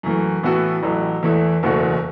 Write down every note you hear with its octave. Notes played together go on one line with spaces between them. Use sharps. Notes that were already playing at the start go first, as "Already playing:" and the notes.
F#2 E3 A3
A2 E3 B3 F#4 A4
A1 A2 F#3
E2 E3 A3 E4
F#1 E2 B2 A3 F#4